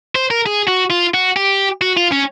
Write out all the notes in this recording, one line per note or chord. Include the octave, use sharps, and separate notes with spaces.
C5
A#4
G#4
F#4
F4
F#4
G4
F#4
F4
C#4